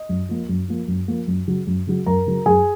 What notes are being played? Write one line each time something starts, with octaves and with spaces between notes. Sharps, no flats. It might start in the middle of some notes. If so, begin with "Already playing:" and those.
Already playing: D#5
F#2
F3 A#3
F#2
F3 A#3
F#2
F3 A#3
F#2
C#3 F#3
F#2
C#3 F#3
F#2 A#4 A#5
C#3 F#3
F#2 G#4 G#5